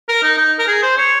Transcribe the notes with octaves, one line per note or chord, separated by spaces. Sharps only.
A#4
D#4
D#4
A#4
G#4
C5
C#5